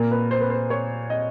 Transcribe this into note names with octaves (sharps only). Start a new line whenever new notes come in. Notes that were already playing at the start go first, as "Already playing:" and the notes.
Already playing: A#2 A#4
B4
C5
B4
C5
C#5
D#5